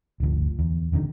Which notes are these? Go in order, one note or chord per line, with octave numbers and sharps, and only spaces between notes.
D1 G1 D2 F3
E2
D#1 F2 D3 D#3